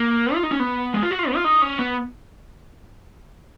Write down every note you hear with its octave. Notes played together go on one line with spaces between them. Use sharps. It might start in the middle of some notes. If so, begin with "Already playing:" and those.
Already playing: A#3
F4
D#4
C#4
B3
G#3
F4
F#4
F4
B3
F4
D#4
C#4
B3